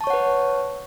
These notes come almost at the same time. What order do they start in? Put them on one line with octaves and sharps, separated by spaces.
A5 C#6 C#5 F#5 B4